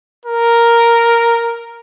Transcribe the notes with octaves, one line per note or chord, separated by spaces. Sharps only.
A#4